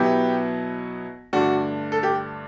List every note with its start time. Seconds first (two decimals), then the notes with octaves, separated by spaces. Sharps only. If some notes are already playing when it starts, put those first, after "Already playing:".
Already playing: B2 F#3 B3 E4 G4
1.33 G2 D3 A3 D4 F#4
1.92 A4
2.03 G4